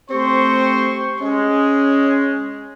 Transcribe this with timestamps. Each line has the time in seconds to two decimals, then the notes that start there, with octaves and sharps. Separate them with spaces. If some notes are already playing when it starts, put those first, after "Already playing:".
0.11 A3 C4 G4 C5 C6 C#6
1.21 G#3 C#4